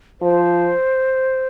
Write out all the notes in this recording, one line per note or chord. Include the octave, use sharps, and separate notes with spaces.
F3 C5